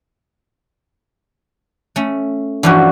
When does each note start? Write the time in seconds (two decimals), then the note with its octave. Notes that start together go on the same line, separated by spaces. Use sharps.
1.96 A3 C#4
2.63 G2 E3 F3 C#4 F#4